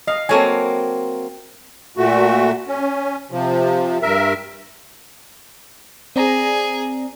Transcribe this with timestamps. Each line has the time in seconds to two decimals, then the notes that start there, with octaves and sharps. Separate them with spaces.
0.07 D#5 F5
0.29 F#3 A#3 C4 A4 C#5 G#5
1.97 A#2 A3 F#4
2.67 C#4
3.31 C3 F3
4.02 G2 A#4 E5
6.16 C4 G#4 D5 A#5